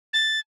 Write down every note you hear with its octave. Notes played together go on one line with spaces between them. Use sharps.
A6